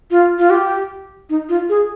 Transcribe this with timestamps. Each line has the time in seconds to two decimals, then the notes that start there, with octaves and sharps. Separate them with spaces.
0.11 F4
0.39 F4
0.50 G4
1.30 D#4
1.49 F4
1.69 G#4